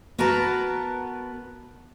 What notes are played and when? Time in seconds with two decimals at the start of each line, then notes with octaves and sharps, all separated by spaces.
0.18 B3 F#4 A#4 B4 A5 A#5